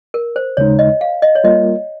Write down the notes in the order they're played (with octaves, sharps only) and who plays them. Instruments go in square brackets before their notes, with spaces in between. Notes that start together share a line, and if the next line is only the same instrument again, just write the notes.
[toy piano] A#4
C5
[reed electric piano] D#2 C#3 G#3 D#4 [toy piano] C#5
[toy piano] D#5
F5
D#5
C#5
[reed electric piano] G3 A#3 F4 A#4 [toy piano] D#5